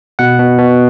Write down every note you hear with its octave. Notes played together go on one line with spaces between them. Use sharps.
B2 F#5
B2
B2